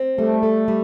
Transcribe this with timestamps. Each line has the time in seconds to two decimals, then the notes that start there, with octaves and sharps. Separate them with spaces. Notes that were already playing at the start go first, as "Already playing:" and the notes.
Already playing: C4
0.18 G3 A3
0.43 A4
0.68 G3